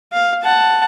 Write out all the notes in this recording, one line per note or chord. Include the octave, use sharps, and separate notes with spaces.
F5
F#5 A5